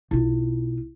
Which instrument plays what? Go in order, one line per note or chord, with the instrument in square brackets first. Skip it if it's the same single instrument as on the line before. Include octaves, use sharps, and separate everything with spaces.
[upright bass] B1 F4 [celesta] E4